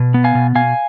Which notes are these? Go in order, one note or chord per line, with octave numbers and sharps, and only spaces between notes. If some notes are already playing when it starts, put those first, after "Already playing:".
Already playing: B2
B3
F5 G#5
B2
B2 F5 G#5